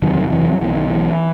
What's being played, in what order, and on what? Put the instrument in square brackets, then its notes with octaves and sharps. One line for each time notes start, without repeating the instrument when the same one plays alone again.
[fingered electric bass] F#1 E2 C3 D#3 F#3
E3
F#3
B1 B2 E3
D#3
E3